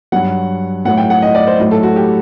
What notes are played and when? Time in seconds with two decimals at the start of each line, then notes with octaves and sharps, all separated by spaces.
0.12 G2 F#3 F#5
0.85 A2 F#3 F#5
0.98 G5
1.10 F#5
1.22 D#5
1.35 D5
1.47 C5
1.59 A2 F#3
1.71 A4
1.83 F#4
1.96 G4